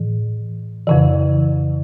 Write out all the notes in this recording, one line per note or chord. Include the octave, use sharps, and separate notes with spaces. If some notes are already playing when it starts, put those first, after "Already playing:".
Already playing: A2 E3
F2 C#3 E3